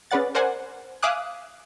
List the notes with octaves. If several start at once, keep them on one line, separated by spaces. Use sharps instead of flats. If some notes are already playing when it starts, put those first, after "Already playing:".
C#4 G#4 B4 D5 F#5 A6
A#4 C5 D5 F#5 G#5
E5 F5 G#5 D6 D#6 F#6